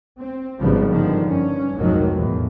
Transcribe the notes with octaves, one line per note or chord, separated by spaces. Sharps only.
C4
G#1 C#2 C#3 F3 G3 B3
G2 D3 D#3 F3 G3
G2 C#4
F1 B1 G#2 D#3 F3 F#3
E2 A2